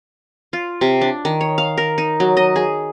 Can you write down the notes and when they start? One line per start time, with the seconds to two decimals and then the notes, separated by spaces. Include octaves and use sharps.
0.53 F4
0.81 C3
1.01 D4
1.25 D#3
1.41 C#5
1.58 F5
1.78 A#4
1.98 D#4
2.20 F#3
2.37 D#5
2.56 G#4